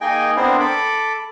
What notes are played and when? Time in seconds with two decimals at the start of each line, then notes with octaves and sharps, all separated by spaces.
0.01 A#3 D#4 G#4 D#5 G5 G#5
0.37 B3 C4 D4 E4 A#4 C5
0.60 A4 B5 D6